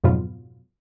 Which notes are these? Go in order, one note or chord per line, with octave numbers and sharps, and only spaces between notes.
F2 G#2 B2 F#3 B3 F4